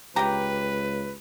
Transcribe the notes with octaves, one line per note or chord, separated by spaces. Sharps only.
C#2 G4 B4 G5 A#5